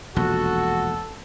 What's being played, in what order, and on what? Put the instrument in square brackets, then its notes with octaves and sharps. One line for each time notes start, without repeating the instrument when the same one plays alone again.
[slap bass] E1 A#1 [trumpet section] F#4 [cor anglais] A4